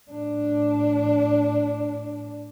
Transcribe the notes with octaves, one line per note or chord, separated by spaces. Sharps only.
A2 D4